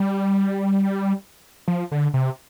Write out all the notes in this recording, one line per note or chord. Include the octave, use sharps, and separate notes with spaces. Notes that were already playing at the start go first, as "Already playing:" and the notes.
Already playing: G3
F3
D3
C3